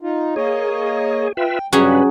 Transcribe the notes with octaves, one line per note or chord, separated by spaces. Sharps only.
D#4 F4
A#3 G#4 C#5 D#5
F4 B4 E5 G5
G2 C#3 F#3 G3 C#4 G#4 B4